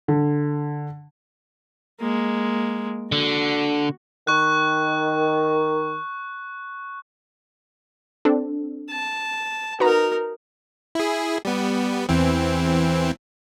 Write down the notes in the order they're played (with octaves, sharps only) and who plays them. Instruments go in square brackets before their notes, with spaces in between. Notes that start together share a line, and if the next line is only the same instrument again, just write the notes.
[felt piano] D3
[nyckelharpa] G#3 A#3
[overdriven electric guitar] D3 [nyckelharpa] F#4
[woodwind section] D#3 [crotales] C#6 F#6
[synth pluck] C4 D4 A4
[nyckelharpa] A5
[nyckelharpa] D#4 A#4 [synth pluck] F#4 B4 A#5
[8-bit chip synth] E4 G#4
G3 B3
E2 E3 C4